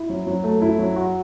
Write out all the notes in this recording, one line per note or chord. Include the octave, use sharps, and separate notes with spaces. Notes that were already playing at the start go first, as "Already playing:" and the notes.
Already playing: E4
F#3
F#3
A3
E4
F#3
F#4